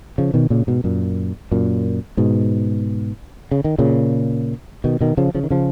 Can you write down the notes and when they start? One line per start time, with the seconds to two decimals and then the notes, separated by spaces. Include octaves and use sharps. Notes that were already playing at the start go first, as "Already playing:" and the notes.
0.18 C#3 F3
0.34 B2 D#3
0.50 A#2 C#3
0.67 G#2 B2
0.84 F#2 A#2
1.51 F#2 A#2
2.17 G#2 B2
3.51 C#3
3.64 D#3
3.78 A#2 C#3
4.84 B2 D#3
5.01 B2 D#3
5.17 C#3 F3
5.35 C#3 F3
5.44 D#3
5.50 C#3 F3